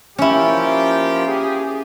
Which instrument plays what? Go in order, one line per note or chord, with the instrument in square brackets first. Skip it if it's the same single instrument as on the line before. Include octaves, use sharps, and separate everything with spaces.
[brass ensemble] F3 A#3 G4 [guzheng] C#4 E4
[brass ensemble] G4 G#4